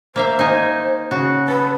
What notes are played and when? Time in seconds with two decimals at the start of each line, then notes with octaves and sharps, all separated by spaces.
0.16 A#3 C5 E5 F5
0.39 D#4 G#5
1.11 C#3 F#4
1.48 A4 B4